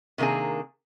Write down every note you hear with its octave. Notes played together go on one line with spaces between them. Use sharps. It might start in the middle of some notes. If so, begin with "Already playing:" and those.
C3 D#3 A#3 D4 G#4